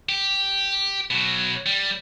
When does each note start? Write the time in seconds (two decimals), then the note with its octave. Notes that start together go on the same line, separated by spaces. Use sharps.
0.09 G4
1.10 B2 F#3
1.66 G3